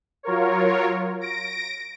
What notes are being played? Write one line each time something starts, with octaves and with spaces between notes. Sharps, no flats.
F#3 F4 A#4 C#5
A#6 D7